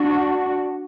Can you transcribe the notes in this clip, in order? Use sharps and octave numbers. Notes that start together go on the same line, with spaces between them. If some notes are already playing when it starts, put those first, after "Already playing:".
Already playing: D4 F#4